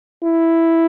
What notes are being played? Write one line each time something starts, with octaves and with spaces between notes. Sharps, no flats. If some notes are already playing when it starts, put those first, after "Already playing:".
E4